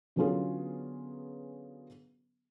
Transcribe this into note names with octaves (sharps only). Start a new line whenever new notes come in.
D3 F#3 B3 C#4 F4 G#4